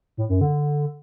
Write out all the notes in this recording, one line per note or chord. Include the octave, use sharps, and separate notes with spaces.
A2
F#2
D3